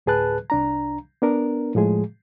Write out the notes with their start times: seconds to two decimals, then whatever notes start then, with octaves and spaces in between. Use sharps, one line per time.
0.06 D2 A2 G#4 B4 A5 F#6
0.50 C2 D4 A#5
1.22 B3 D4 A#4
1.75 A2 F3 G#3 G#4